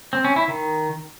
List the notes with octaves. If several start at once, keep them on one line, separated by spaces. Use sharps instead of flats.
C4
C#4
E4
D#3